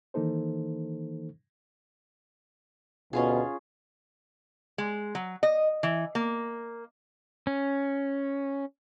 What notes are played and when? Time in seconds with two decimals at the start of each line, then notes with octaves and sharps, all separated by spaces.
0.14 D#3 E3 A#3 D#4 A4 C5
3.13 D2 B2 C#4 F4 G#4
4.78 G#3
5.15 F#3
5.43 D#5
5.83 E3
6.15 A#3
7.47 C#4